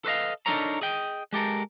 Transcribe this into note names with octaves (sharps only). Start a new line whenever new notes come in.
A4 B4 C5 D#5 F5
D4 D#4 A4 A#4 C#5 A#5
G#4 D#5 G5
G#3 G4 A4 A#4